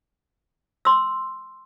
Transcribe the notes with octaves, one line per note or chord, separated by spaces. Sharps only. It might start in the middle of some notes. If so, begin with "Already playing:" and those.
C6 E6